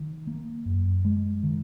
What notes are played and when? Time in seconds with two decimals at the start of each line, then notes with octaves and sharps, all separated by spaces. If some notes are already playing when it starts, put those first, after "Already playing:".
Already playing: D#3
0.27 A#3
0.65 F#2
1.05 G#3
1.43 D#3